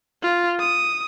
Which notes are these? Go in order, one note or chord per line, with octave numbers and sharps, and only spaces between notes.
F4
D#6